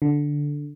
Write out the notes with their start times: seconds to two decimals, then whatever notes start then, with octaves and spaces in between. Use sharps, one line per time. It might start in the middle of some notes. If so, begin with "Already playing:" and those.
0.02 D3